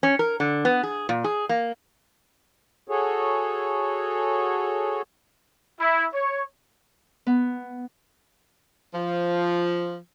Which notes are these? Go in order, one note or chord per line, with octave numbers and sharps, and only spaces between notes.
C#4
A#4
D3
B3
G#4
A#2
G#4
A#3
F#4 G#4 A4 C#5
E4
C#5
B3
F3